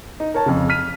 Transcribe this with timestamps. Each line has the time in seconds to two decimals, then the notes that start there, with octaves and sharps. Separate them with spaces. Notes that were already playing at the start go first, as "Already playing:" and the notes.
0.20 D#4
0.34 A#4 C#5 A5
0.46 F2 C#3
0.69 F6 B6 D#7